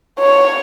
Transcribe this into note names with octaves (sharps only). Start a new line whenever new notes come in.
C#5